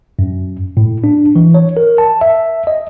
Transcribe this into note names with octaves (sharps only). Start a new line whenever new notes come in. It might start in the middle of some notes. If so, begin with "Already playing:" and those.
F#2
A2
D4
E3
C#5
A#4
A5
E5
D#5